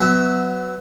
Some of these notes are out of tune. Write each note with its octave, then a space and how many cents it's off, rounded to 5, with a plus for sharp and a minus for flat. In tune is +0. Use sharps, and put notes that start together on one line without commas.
F#3 +0 B3 +20 E5 -15